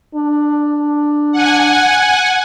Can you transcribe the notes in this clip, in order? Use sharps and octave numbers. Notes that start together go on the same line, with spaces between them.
D4
F#5 G#5